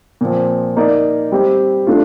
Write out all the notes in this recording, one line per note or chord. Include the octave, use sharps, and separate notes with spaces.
A#2 F3 C4
A#3 D#4 A#4 D5
G3 C4 G4
A3 D4 F4